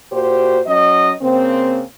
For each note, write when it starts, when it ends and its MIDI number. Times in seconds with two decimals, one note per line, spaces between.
0.11 0.59 46
0.11 0.59 66
0.11 0.59 67
0.11 0.59 72
0.65 1.12 54
0.65 1.12 61
0.65 1.12 75
1.21 1.82 49
1.21 1.82 58
1.21 1.82 60